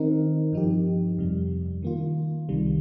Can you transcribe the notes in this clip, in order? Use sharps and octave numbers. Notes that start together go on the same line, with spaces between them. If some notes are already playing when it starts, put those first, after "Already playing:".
Already playing: D#3 C4 D#4 A#4
G2 F3 D#4 G4
F2 C3 G3
D#3 A#3 F4
C2 C3 D#3 G3